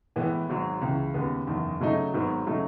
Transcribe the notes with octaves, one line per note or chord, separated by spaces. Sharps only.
A2 E3 G#3 B3
G#1 G#2 F#3
C#2 C#3 E3
D#2 C#3 G#3 B3
F#1 E2 D#3
C#3 F#3 A3 D#4
G#1 G#2 D#3 F#3 B3
C#3 F#3 A3 D#4